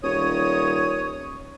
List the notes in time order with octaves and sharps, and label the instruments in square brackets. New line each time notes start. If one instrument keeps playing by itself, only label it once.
[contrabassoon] D#1 [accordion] C#5 D#6